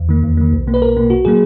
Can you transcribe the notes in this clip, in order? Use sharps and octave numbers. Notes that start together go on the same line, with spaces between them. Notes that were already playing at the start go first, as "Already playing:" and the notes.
Already playing: E2
D#3 A#3
E2
D#3 A#3
B1
B2 A#3
B4
B1 A#4
B2 A#3
B1 F#4
A#2 F#3 A#3 G#4